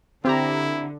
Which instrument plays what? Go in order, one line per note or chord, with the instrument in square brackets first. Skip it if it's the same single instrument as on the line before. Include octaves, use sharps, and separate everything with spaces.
[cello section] D3 [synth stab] C4 G4 A#5 [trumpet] E4